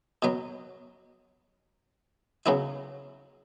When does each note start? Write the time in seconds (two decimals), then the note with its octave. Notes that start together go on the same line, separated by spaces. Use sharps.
0.22 B2 F#3 B3
2.46 C#3 F#3 B3 E4